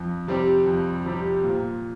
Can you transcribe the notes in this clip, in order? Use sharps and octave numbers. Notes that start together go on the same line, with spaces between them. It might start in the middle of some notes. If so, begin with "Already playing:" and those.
Already playing: F2
C3 G3 C4 G4
F2
C3 G3 C4 G4
A#2